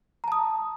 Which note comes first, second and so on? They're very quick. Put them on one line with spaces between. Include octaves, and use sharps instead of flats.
A#5 A5 D#6